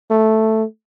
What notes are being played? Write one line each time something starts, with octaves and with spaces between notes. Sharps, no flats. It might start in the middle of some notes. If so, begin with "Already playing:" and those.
A3